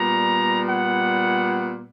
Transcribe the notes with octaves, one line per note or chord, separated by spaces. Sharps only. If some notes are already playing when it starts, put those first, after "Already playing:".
Already playing: A#2 G3 B3 A#5
F#5